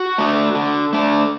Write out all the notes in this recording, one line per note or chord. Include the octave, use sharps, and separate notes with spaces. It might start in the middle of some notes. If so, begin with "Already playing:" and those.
Already playing: F#4
A3 D4
D3
A3 D4